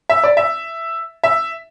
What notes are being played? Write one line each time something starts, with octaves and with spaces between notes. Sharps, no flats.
E5
D5
E5
E5